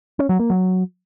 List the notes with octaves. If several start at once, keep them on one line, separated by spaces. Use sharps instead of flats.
C#4
F#3
A#3
F#3